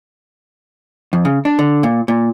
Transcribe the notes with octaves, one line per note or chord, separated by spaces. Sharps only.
F2
C#3
D4
D3
A#2
A#2